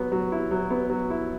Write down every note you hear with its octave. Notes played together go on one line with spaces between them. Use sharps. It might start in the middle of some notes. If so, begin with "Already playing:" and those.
Already playing: F#3 B3
F#3
E4
F#3
B3
F#3
E4